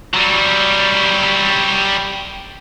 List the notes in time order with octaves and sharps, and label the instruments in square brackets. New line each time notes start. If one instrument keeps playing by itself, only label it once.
[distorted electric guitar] F#3 G3